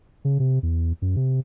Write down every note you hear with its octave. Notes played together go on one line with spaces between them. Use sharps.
C#3
C3
E2
F#2
C3